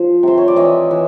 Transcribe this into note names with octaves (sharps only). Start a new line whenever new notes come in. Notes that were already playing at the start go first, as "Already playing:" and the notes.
Already playing: F3 C5
C3 C5
C#5
D5
E3 C#5 D#5
E3